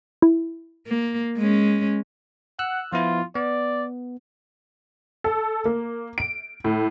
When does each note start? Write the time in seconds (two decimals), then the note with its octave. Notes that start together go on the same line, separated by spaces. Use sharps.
0.22 E4
0.87 A#3
1.37 G#3 C#4
2.59 F#5 E6 F#6
2.93 F3 B3 E4 F4
3.36 B3 D5
5.24 A4
5.65 A#3
6.18 D7
6.64 A2